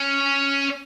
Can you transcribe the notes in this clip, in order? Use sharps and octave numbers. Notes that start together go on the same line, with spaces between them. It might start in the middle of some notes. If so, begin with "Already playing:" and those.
Already playing: C#4